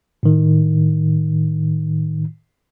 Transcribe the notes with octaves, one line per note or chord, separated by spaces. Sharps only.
A2 D#3